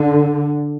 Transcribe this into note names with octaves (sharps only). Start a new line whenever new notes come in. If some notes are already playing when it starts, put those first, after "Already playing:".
Already playing: D3